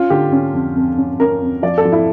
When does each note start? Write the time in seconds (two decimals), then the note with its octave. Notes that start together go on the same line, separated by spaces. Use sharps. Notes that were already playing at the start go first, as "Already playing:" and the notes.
Already playing: C#4 F4
0.10 D3 G4
0.32 C#4
0.54 F2
0.75 F2
0.98 C#4
1.20 C#4 A#4
1.42 F2
1.63 F3 D5
1.78 A4
1.85 F3
1.92 E4